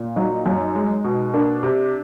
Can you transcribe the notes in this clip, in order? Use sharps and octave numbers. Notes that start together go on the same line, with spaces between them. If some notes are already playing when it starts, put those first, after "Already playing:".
Already playing: A#2
F#3 D#4
F#2
G#3
B2
A#3 D4
C3